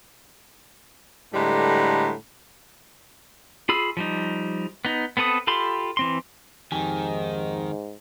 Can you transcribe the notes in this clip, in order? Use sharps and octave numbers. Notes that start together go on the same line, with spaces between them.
A2 D3 G3 G#3 B4 A#5
F4 G#4 B5 E6
F3 G3 D#4
B3 D#4
B3 C4 A4 B4 D#6
F4 G4 A4 B5 C6
E3 C4 C6
F2 G#2 D#3 G4 G#5